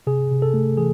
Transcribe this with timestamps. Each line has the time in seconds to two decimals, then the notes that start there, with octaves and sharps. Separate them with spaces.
0.07 C3 G#4
0.31 C3
0.42 A4
0.54 A3
0.77 E3 G#4